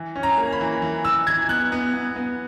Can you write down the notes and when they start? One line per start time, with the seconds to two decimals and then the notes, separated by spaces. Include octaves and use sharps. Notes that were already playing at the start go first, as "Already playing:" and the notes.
Already playing: E3
0.16 C#4
0.23 A#5
0.38 A#3
0.53 B5
0.61 E3
0.82 E3
1.05 E3 E6
1.26 E3 G#6
1.49 B3 F#6
1.72 B3
1.94 B3
2.16 B3